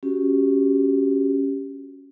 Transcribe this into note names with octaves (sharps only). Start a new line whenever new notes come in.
C#4 F#4 G4